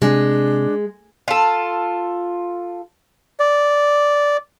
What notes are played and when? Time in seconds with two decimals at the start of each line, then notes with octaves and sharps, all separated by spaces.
0.02 C3 G#3 D4
1.28 F4 A4
3.40 D5